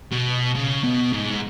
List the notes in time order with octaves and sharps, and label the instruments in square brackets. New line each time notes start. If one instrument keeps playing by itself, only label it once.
[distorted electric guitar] B2
C#3
B2
G#2